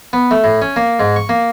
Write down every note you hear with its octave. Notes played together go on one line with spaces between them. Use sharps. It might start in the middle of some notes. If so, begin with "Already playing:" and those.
B3
A3
A2
C#4
A#3
G#2
C#6
A#3